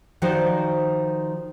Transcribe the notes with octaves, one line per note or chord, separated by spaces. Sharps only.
D#3 F3 D#4 F#4 C5 D5